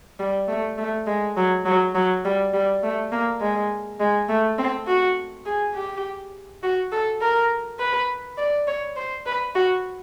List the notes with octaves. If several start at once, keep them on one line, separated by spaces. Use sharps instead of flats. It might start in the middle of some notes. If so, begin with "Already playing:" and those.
G3
A3
A3
G#3
F#3
F#3
F#3
G3
G3
A3
A#3
G#3
G#3
A3
C4
F#4
G#4
G4
F#4
A4
A#4
B4
D5
C#5
C5
B4
F#4